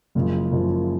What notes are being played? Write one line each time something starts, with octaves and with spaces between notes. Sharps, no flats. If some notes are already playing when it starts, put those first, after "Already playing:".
F#1 F#2 C#3 F3 G#3
F#1 F#2 C#3 F3 G#3